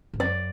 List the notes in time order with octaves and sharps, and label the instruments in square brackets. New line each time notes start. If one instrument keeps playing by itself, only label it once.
[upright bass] G#2
[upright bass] F#2 [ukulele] D5